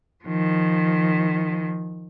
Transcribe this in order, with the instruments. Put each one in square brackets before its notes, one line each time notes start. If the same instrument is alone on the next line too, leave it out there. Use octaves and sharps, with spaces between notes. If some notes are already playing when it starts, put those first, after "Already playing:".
[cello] D#3 F3